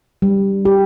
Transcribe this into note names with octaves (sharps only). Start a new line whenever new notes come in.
G3
G4